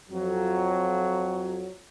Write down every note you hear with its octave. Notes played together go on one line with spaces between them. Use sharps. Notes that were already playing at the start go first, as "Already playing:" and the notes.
F2 F#3